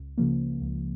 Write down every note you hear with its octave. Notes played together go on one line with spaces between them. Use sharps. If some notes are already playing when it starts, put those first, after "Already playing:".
Already playing: C#2
C#3 F3 A#3
C#2